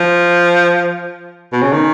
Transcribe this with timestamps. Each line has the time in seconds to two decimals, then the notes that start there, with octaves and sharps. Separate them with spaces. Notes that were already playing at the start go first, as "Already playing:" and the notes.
Already playing: F3
1.52 B2
1.62 C#3
1.72 D#3